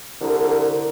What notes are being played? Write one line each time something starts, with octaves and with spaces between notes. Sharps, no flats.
C2 D3 A#4 A#5